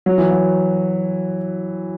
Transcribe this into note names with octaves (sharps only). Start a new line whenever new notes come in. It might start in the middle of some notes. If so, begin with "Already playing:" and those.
F#3
E3
F#3